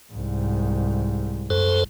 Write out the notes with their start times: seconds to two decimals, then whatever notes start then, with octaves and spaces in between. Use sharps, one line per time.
0.13 C2 G#2
1.50 F#2 A4 C5